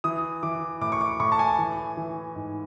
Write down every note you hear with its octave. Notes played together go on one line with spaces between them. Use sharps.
E3 D#6
E3 D6
A2 D6
C#6
D6
A2 C#6
A5
G#5
E3
E3
G#2